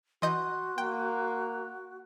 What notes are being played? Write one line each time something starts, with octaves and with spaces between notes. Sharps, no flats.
E3 F#4 D#5 C6 G6
A#3 G5